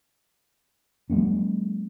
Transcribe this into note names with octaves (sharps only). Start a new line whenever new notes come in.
F#3 G#3 A#3 C#4